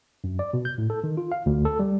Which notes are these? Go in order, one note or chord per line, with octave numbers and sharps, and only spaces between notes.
F#2
D5
B2
G6
A2
A4
D#3
F4
F5
D2
A4
G3